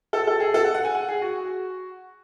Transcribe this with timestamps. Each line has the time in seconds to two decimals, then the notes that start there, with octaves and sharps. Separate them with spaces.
0.13 A4
0.27 A4
0.40 G#4
0.54 A4
0.64 F#5
0.74 F#5
0.85 G#5
0.95 F#5
1.09 G#4
1.22 F#4